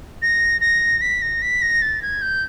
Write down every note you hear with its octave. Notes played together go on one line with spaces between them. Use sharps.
A#6
A#6
B6
A#6
B6
A#6
A6
G#6
G6